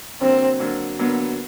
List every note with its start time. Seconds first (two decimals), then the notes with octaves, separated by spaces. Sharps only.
0.21 D3 F#3 A#3 C4
0.59 D3 F#3 A#3
0.99 D3 F#3 A#3 B3